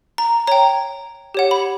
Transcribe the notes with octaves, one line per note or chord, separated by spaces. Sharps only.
A#5
C#5 G5 A#5
G4 C#5 F#5
B5